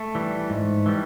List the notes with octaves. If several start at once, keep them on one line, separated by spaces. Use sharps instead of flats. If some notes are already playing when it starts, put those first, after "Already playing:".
Already playing: A3
E3 G3
G#2
E3 G3